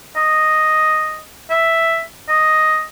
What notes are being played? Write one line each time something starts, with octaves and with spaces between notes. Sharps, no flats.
D#5
E5
D#5